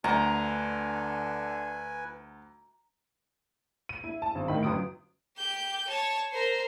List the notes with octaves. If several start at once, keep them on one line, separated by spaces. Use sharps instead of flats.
D2 D3 B4 G#5 A#5
D#7
E4
A5
G#1
A2 D#3 B5
G1 F#2 D#6 D7
G4 G6
C#5 A5
A#4 C5